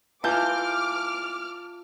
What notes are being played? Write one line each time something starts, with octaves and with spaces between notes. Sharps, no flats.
E3 F4 A5 D6 F6 G6